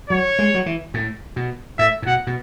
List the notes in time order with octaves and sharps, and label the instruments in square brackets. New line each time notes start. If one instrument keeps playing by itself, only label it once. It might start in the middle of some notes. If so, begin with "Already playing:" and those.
[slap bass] F#3 [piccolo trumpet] C#5
[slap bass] G#3
F#3
E3
A2
B2
[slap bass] A2 [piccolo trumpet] E5
[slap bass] A2
[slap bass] B2 [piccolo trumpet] F#5
[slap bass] B2